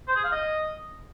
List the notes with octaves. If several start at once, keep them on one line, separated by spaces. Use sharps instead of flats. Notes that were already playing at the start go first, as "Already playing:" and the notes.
C5
G#4
F5
D#5